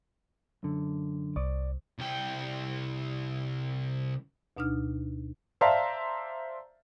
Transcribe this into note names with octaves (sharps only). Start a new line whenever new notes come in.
F#2 D3
C2 D5
C2 G5
D2 B2 D4 D#4 F6
C5 D5 E5 F5 A5 A#5